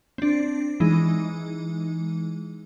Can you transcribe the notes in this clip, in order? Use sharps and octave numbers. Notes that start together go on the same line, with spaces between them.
C4 D4
E3 G#3 D#4